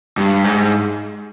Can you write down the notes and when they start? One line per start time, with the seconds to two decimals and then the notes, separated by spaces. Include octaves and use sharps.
0.17 G2
0.44 G#2